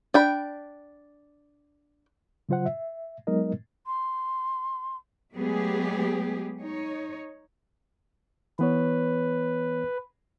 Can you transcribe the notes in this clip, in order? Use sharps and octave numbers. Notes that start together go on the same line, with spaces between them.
D4 G5 B5
C#3 F#3 F4 C5 F#5
E5
F#3 G#3 B3 D#4 A#4 D#5
C6
F#3 G#3 A3 B3 G4 G#4
D#4 C#5
E3 B3 B4 C#5